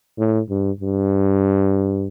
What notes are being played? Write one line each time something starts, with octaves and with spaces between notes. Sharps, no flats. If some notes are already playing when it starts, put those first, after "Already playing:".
A2
G2
G2